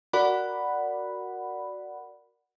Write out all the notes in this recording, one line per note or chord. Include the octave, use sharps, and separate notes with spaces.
F#4 A#4 D5 F#5 B5